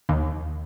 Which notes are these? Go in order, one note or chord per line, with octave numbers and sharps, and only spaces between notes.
D#2